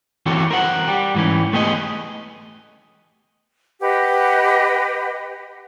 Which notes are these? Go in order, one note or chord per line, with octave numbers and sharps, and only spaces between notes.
E3 C4 F#4 G4 A4 C#5
A#4 C5 F#5
G3 G4
G#2 E3 C#4
A3 B3 G4 G#4 C5 D#5
G4 B4 D#5 F#5